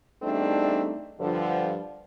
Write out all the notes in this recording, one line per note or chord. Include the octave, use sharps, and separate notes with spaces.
E2 G3 A3 C4 D4 D#4
G2 D3 F3